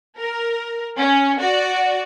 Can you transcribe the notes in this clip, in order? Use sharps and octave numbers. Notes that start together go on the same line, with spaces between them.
A#4
C#4
F#4 D5